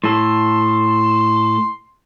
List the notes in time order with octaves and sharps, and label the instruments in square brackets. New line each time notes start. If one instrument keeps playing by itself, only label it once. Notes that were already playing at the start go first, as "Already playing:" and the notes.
[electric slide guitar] A2 A4 [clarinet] C6